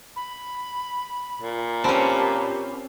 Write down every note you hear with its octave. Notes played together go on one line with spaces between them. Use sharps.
B5
A#2
C4 C#4 G4 A5 B5